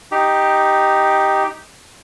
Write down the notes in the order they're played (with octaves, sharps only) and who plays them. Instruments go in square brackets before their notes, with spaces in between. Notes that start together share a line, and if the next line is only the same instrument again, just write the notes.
[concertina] D#4 G4